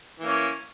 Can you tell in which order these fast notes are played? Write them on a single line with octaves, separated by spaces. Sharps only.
E3 A#3 C#4